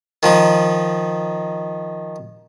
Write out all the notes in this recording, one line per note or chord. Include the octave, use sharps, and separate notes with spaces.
D#3 F3 D#4